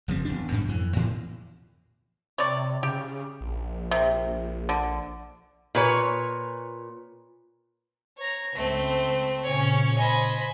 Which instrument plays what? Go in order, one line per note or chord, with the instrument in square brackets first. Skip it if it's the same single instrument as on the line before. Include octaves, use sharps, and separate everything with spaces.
[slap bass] F#1 F3 G3 C4
D#1 E2 D4
G#2 B2 G3
F2 E3
A2 E3 F3
[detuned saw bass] C3 [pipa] C#5 D5
[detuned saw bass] C#3 [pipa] G4
[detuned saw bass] A#1
[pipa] C3
D3
[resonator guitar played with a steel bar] A#2 B4 C#5
[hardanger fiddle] C#5 A#5
[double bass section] C#2 [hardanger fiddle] A3 C4
[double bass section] A#2 C#3 [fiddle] C#4 C#5
[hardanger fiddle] C5 D#5 [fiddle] G#5 B5